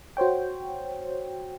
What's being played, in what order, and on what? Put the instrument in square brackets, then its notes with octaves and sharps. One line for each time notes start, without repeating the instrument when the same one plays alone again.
[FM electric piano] F#4 C5 C#5 G5